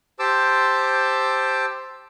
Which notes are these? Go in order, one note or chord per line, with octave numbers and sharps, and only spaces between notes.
G4 C5 A5 D6 E6